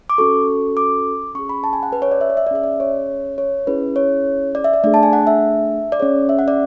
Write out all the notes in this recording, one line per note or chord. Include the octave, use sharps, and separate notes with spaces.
D6
C#4 F#4 A4 C#6
D6
C#4 G#4 C#6
B5
A5
G#5
F#5
B4
C#5
D5
E5
D5
E5
D5
C#4 G#4 E5
D5
C#5
C#5
C#4 E4 G#4 B4
C#5
D5
E5
D5
A3 D4 G#4 D5
A5
G#5
F#5
E5
D5
C#4 G#4 C#5
E5
F#5
D5